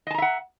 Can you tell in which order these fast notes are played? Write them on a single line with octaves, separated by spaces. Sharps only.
D#5 A5 A#5 E5 F#5